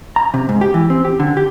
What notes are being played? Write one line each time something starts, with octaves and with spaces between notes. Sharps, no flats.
A#5
C3
G#2
G4
E3
C4
G4
D3
G4